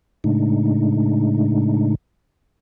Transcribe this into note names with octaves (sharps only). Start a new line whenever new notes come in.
A2 C#3 G#3 A3 D4 D#4